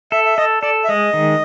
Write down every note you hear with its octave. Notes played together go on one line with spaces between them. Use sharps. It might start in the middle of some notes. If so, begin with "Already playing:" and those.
A4 E5
E5
A4 D#5
A4 D5
E5
G#3 D#5
D#3